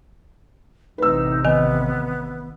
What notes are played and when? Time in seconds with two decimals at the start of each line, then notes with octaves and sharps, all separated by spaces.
0.98 A1 C3 D#4 B4 E6
1.45 D#3 B3 G#5